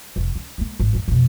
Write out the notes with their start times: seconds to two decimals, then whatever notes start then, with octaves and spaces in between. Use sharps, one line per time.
0.16 F1
0.35 C#4
0.58 G#3 A#3
0.80 G#1
0.93 F#2 D#3
1.08 F2 B2